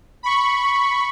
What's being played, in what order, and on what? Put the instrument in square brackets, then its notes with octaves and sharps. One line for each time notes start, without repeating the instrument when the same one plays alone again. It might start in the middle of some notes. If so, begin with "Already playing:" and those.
[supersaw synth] B5 C#6